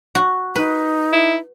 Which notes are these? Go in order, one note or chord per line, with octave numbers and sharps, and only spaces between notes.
F#4
D#4 B4
E4